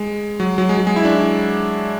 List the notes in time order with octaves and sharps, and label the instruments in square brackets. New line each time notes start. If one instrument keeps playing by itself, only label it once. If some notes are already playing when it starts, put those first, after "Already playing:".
Already playing: [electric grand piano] G#3
F#3
F#3
G#3
F#3
G#3
E4
D4
E4